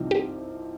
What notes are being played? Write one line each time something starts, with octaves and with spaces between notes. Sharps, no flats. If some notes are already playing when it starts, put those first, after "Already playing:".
Already playing: C2 C3 F3 C4 D#4
G4